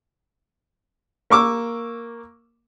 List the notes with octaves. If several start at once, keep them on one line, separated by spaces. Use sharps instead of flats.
A#3 C#6 D6 E6